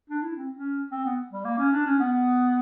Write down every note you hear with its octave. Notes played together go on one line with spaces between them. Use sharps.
D4
E4
C4
C#4
C4
B3
G3
A#3
C#4
D4
C#4
B3